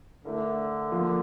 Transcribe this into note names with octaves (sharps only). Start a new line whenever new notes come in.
D3 A3 E4 A#4
F3 A#3 F4